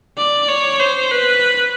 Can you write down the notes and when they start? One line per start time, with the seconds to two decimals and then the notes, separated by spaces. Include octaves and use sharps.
0.18 D5
0.49 C#5
0.80 C5
1.11 B4